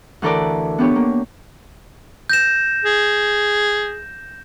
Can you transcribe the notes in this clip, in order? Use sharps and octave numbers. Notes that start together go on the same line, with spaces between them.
D2 E3 A4 A#4 D5
B3 D4 G4 C#5
A#3
G6 A#6 E7
G#4